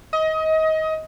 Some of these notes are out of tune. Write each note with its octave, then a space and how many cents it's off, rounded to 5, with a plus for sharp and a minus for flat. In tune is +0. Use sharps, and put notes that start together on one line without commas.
D#5 +25